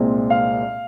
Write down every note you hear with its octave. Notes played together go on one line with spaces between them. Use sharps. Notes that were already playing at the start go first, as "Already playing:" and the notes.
Already playing: C2 A#2 G#3 C4
F5